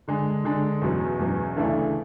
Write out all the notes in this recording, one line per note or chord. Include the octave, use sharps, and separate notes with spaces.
D3 G#3 D4
D3 G#3 D4
E2 B2 F#3 C#4
E2 B2 F#3 C#4
D2 C#3 E3 A3 D4